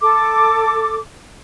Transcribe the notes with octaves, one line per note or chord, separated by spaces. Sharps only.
A4 D6